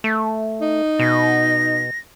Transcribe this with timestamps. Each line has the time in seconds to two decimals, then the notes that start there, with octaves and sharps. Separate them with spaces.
0.04 A3
0.61 D#4
0.99 B2 A#6